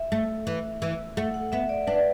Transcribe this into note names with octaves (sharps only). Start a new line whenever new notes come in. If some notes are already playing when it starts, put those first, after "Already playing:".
Already playing: E5
A3
E3
E3
A3 F#5
F#5
B3 E5
D5
D4 B4